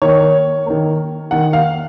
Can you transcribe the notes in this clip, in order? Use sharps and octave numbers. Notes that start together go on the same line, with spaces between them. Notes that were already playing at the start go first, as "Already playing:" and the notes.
D#3 A#3 C#5
D#3 A#3
D#3 A#3 F#5
F5